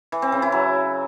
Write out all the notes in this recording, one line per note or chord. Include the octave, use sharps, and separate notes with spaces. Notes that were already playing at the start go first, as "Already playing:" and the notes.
E3
C4
C#3
E4
F#3